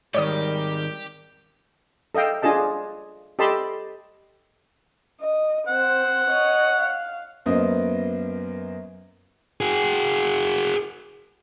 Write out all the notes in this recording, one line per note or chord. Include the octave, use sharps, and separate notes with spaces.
G#2 D#3 G3 G4 A#4 C#5 D5 D#6
A4 D#5 F5 G5
D4 F4 G#4 D#5 A5
G4 A4 D#5 A5 B5 C6
D#5
C4 C5 F#5
C#5 D#5
F5
F#2 A#3 B3 C5 D#5 D#6
F#4 G#4